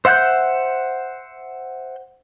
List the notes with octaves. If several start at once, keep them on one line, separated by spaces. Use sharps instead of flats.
C5 E5 F#5 F#6 G6